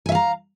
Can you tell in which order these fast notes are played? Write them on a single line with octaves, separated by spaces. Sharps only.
G#5 E5 F5 A#5